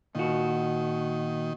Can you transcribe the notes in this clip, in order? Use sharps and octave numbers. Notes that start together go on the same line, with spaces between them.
A#2 D#3 F#4